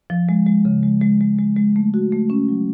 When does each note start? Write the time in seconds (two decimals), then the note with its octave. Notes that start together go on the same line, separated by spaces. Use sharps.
0.10 F3
0.29 G#3
0.47 G#3
0.65 C#3
0.83 G#3
1.02 G#3
1.21 G#3
1.39 G#3
1.57 G#3
1.76 A3
1.94 F#4
2.12 A3
2.30 C#4
2.49 F#3